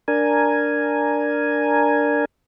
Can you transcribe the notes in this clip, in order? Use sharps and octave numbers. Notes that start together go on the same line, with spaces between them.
D4 A#4 G#5